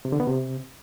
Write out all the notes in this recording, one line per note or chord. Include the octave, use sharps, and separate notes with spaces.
C3
D3
B3
C3